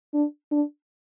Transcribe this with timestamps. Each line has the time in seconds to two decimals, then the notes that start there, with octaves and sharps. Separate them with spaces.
0.13 D4
0.51 D4